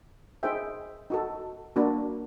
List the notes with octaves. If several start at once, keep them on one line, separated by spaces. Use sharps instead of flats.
D#4 G#4 C5 E5 G5
D#4 F#4 A4
A#3 D4 F#4